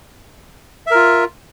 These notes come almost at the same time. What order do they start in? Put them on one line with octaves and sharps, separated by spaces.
E5 A#4 F4